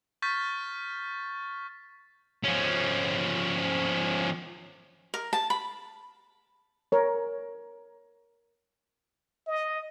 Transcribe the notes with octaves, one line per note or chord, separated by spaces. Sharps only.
C#6 F6 G6 A6 B6
F3 C#4
A#4
A5
B5
A#4 C#5
D#5